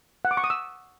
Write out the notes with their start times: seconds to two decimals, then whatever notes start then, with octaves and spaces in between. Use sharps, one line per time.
0.25 F#5
0.31 D6
0.37 C#6
0.44 D#6
0.50 E6